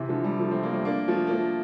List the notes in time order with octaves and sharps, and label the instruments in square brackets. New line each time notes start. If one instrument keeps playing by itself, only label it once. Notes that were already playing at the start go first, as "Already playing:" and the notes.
Already playing: [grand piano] C3 E3
D3 F3
E3 G3
F3 A3
A3 C4
G3 A#3
A3 C4
A#3 D4
F3 A3
A#3
F3 A3